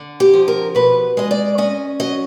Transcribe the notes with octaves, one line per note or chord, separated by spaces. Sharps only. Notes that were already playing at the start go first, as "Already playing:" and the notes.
Already playing: D3
G4
F3
A#4
B2 B4
G#3 D#5
D5
C#4 D#5
F#3 D#5